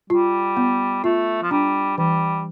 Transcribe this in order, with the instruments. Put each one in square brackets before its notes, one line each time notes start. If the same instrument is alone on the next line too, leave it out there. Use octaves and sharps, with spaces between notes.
[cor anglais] G3 [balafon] F4
[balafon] B3
[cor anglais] A3 [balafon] F4
[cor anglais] F3
[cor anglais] G3 [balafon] D4
[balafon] E3 [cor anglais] G3